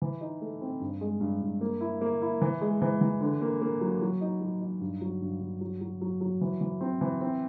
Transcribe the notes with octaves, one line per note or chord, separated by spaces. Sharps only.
E3
D#4
A3
C4
G2
G#3
G2
G2
A#3
E4
A#3
E4
E3
G#3
E3
E3
D3
A#3
A#3
F#3
F#3
D#4
F#3
D#4
G2
F#3
G2
G2
F#3
F#3
F#3
F#3
E3
E3
C4
E3
C4